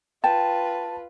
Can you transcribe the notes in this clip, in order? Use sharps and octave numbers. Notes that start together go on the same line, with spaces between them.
F4 B4 G5 A5